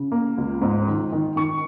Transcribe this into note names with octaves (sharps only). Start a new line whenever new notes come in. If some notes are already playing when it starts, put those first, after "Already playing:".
Already playing: C#3
A#3
C#2
G#2
D#3
D#3
D#3 C#6